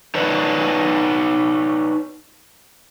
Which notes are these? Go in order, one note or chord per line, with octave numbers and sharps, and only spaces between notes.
D#4 B4 C#5 D5